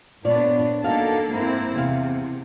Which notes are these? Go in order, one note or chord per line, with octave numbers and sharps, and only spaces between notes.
A#2 B3 D4 F4 C#5 D5
A#3 D4 D#4 F#4 A4 F5
G#2 A#3 C4 E4
E2 C3 F5